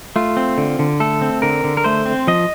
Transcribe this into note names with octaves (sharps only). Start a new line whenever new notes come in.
A3 F4
C4
D3
D3
A3 A4
C4
D3 A#4
D3
A#4
A3 C5
C4
F3 D#5